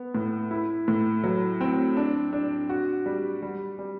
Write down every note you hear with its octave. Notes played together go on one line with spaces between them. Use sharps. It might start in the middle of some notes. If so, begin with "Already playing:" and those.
Already playing: B3
A2
E4
A2
F#3
C4
D4
D4
F#4
G3
G3
G3